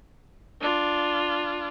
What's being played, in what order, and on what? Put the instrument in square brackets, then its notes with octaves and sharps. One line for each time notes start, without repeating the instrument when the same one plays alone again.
[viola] D4 F4